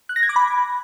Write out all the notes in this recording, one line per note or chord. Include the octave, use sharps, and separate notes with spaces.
F#6
A#6
G#6
D6
B5